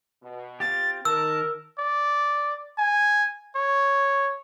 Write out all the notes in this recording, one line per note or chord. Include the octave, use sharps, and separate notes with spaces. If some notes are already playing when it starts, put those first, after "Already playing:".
B2
C4 F4 G4 A6
D#3 A#4 A5 E6
D5
G#5
C#5